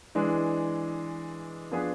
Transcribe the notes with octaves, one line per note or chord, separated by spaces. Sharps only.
E3 G#3 D4
F3 B3 D4 G#4 B4